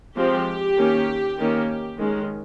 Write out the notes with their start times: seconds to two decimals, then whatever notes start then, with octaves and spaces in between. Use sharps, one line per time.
0.16 F3 G#3 C4 G4
0.77 D#3 A#3 C#4
1.38 D#3 A#3 C#4
1.98 D#3 G#3 C#4